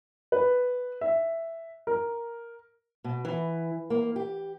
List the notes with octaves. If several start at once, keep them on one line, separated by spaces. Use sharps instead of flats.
B4
E5
A#4
B2
E3
A#3
G4